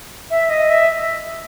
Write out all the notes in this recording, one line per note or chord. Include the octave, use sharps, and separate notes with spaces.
E5
D#5
E5